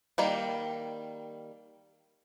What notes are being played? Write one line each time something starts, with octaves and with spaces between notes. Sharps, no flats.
D#3 G3 A#3